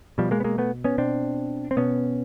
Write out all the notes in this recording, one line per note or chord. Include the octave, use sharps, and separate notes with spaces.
B2 F3 G3
G#3 A#3
B3
G#3 A#3
A3 B3
B3 C#4
B2 C4 D4
C4
B2 B3 C#4